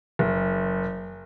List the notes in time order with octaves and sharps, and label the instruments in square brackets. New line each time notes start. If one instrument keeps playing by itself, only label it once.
[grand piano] F#1